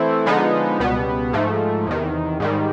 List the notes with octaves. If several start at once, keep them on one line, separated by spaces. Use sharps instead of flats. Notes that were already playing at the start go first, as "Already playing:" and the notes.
Already playing: E3 A3 C4 E4
D3 F3 G#3 B3 D#4
C#2 B2 G3 B3
G#2 F3 A3
E2 C3 D#3
G#2 D#3 G3